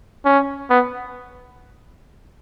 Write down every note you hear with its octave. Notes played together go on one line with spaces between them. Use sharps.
C#4
B3